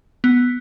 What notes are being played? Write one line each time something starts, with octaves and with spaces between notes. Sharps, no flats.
B3